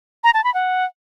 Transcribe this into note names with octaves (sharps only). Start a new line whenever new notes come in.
A#5
A5
B5
F#5